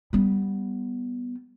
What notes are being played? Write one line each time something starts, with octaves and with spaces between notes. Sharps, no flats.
G3 B3